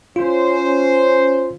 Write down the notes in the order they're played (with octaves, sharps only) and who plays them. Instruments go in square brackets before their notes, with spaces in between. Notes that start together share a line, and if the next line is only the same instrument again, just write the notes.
[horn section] C#4 C5 [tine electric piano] F4